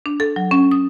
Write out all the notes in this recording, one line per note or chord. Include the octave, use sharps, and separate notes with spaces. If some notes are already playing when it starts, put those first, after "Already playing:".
D4
A4
F#3
C#4
D#6